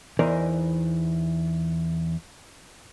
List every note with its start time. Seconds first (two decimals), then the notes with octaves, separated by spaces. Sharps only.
0.19 E2 E3 D#4 A#4 C5 D5